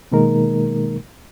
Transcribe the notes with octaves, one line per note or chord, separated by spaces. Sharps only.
B2 D#3 G#3 A#3 D#4 A#4